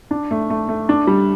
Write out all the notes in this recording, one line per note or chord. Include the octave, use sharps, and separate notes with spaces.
D4
A3
A3
A3
D4
G3